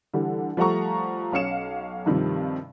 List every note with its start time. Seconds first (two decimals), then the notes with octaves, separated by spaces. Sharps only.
0.14 D3 E3 G3
0.57 F3 G3 A3 F#5 A#5 C#6
1.32 B1 C#4 F5 C#7 E7
2.06 G2 C3 D#3 F3 G3